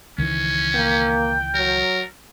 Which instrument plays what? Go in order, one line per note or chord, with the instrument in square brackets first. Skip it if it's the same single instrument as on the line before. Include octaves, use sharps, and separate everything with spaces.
[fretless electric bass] C#2 D#3 E3 [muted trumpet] C#4
[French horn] A#3 [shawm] G5
[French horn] F#3 [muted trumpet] A#4